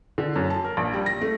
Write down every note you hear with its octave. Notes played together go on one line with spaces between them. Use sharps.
D3
F#2
A5
A#4
A#1
G3
A#6
A3